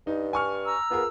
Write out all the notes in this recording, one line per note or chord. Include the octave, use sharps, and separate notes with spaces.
G2 D#4
G#5 C#6 F6
A#5 E6
B3 F4 G#4 A#4